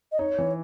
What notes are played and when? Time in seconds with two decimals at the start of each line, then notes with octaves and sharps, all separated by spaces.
0.11 D#5
0.19 D#4 C#5
0.38 E3